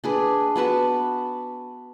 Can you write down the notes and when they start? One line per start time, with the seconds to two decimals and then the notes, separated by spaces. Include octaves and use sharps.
0.04 D4 G#4 B4
0.56 B3 F#4 B4 A5